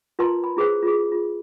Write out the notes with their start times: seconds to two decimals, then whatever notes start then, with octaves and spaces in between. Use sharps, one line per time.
0.19 F4 A#4 B4 A5 A#5 C6
0.44 B5
0.57 E4 G#4 B4 C5
0.83 F4 G#4
1.12 F4